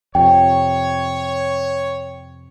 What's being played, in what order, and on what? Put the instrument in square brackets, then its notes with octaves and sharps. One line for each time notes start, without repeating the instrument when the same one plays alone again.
[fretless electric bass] F2 C3 [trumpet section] C#5 [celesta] G5